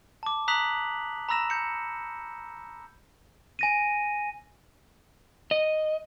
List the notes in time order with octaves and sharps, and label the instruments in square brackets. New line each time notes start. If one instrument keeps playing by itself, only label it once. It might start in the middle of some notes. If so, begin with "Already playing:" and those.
[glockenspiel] A5 D6
A#5 D#6 F#6 B6 F7 F#7
A#5 B5 E6 A#6 E7
G6 C#7
G#5 A#6 D#7
[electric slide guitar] D#5